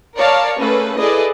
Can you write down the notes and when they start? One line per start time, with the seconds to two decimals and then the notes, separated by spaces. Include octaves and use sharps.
0.16 A#4 C#5 D5 F5 A5
0.57 A3 A#3 C#4 G#4 A4 B4
0.97 E4 G#4 A4 B4 D5 D#5